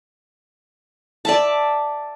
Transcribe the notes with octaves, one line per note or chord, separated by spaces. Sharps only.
D5 E5 A5